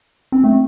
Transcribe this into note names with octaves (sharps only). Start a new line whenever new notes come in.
C4
A3